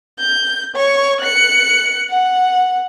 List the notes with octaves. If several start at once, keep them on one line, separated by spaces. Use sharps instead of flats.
G6
C#5 C#6
F#6 C#7
F#5